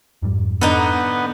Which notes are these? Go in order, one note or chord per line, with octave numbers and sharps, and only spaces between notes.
F2 G#2 G3
D3 B3 D#4 A#5